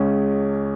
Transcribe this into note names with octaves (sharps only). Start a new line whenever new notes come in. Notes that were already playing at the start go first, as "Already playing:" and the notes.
Already playing: C#2 C#3 G#3 C#4